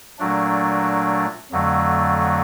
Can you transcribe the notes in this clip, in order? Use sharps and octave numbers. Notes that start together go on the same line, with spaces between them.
A#2 F#3 A3 D4
F2 D3 F#3 A3